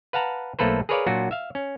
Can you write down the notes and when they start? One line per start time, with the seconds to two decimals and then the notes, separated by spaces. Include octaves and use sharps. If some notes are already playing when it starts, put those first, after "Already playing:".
0.13 B4 F5 F#5 A5 A#5
0.59 B1 A3 A#3 A4 B4 C5
0.89 G#4 A#4 B4 C#5 D5 F5
1.06 A#2 F#3 D4 F4 F#4
1.31 E5 F5
1.55 C#4